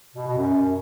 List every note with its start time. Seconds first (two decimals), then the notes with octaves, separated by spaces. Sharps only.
0.16 B2
0.26 B2
0.37 F#2